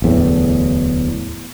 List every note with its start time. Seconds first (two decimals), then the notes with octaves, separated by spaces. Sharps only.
0.02 D1 E2 A2